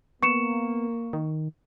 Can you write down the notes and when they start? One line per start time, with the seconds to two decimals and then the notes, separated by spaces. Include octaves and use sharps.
0.23 A#3 B3 C#6 C#7 E7
1.13 D#3